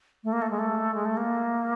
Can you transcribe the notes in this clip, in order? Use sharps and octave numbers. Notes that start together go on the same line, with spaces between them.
A3
A#3
A3
G#3
A3
G#3
A3
A#3